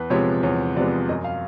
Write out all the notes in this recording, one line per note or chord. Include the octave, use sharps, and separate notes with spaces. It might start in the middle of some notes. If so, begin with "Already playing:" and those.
Already playing: E2 B4
C3 F3 G#3 B3 C#5
E2 C#5
C3 F3 G#3 B3 D5
F#2 D#5
F5